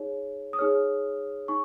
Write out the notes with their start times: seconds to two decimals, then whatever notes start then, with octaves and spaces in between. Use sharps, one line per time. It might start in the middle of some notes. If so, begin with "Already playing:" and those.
Already playing: D#4 G#4 C#5
0.53 D#6
0.59 D#4 G#4 C#5 F6
1.48 D#4 C#6